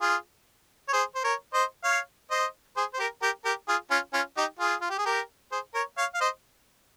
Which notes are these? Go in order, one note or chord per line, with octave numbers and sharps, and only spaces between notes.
F4 G#4
C#5
G#4 C5
C5
A#4 C#5
C5 D#5
C#5 F5
C5 D#5
G#4 C5
C5
G4 A#4
G4 A#4
G4 A#4
F4 G#4
C#4 F4
C#4 F4
D#4 G4
F4 G#4
F4
G4
G#4
G4 A#4
G#4 C5
A#4 C#5
C#5 F5
F5
C5 D#5